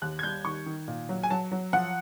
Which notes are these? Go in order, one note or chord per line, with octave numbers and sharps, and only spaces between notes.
D#2 F#6
G#6
G3 G6
D#3 C#6
D#3
A#2
F#3
G#5
F#3 A5
F#3
F3 F#5